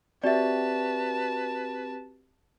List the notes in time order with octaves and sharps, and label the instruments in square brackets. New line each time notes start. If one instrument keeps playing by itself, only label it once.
[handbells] C4 F#4 G4 [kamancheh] B4 A5 [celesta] D5 E5